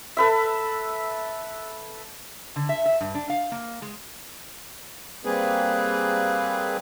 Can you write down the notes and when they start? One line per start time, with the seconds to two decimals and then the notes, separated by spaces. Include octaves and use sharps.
0.17 A4 B4 E5
2.56 D3
2.69 E5
2.86 E5
3.01 G2
3.15 D4
3.30 F5
3.52 A#3
3.82 G#3
5.25 G3 A#3 C4 G#4 B4